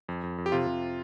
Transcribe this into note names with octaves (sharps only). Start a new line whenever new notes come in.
F2
F2
F2
G4
C3 F4
C3